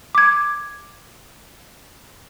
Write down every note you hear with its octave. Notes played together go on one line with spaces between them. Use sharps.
D6 G#6